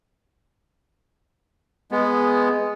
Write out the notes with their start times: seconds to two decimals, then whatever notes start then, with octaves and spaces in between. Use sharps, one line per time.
1.91 G#3 B3